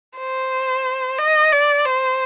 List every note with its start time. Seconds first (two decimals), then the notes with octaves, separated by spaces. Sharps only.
0.18 C5
1.19 D#5
1.52 D5
1.86 C5